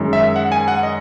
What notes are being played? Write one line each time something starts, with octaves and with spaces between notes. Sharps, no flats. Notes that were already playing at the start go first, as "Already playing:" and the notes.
Already playing: F#2 D#3 G#3
E5
F#5
G#5
F#5
D#5